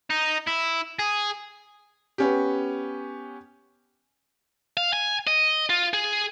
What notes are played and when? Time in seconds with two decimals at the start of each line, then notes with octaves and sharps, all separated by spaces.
0.10 D#4
0.47 E4
0.99 G#4
2.18 B3 C#4 G4
4.77 F5
4.93 G#5
5.27 D#5
5.70 F4
5.93 G#4